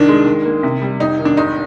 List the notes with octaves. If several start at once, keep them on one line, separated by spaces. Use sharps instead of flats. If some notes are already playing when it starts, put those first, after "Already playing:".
Already playing: C2 D#3 D4
G#3
D#3
A#3
C3
G3
F1 D#4
D#3
D4
G#1 D#4